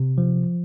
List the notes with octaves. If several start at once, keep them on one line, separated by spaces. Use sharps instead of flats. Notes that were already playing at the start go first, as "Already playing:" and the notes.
Already playing: C3
F3